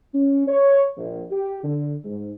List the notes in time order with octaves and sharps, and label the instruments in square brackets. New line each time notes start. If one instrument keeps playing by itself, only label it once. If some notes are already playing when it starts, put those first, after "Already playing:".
[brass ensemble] C#4
C#5
A#1
G4
D3
G#2